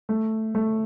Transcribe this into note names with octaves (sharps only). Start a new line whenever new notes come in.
A3
A3